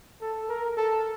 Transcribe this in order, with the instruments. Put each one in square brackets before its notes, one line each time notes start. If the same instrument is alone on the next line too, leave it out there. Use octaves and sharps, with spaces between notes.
[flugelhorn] A4
A#4
A4